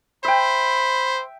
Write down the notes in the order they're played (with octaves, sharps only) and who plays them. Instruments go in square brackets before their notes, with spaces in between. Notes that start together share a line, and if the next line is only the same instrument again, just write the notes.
[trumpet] C5 [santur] E5 G5 [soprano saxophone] B5